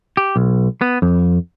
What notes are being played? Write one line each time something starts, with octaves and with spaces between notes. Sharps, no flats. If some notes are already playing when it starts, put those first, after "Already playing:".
G4
B1
B3
F2